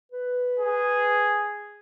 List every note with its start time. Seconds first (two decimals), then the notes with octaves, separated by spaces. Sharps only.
0.12 B4
0.59 G#4